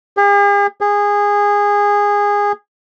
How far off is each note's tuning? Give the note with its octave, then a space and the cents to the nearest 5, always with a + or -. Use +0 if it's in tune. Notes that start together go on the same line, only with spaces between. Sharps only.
G#4 -45
G#4 -20